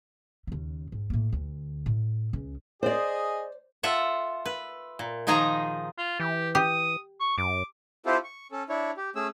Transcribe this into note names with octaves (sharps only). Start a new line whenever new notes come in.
D#2 C#3
G#2
A2 A#3
D2
A2
C#2 C#3
G#4 C5 D5 D#5
F4 A4 E5 F#5
B4
A#2
D#3 F3 D#4 F4 G#4 A#5
F4
E3 G4
G4 D#6
C#6
F#2 D6
C4 E4 F4 G4 A4 C5
C#6
C#4 A4
D4 E4 C#5
G4
A3 C#4 G#4 E6